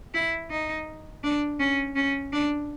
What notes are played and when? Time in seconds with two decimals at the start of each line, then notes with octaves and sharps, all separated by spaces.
0.14 E4
0.50 D#4
1.24 D4
1.59 C#4
1.96 C#4
2.33 D4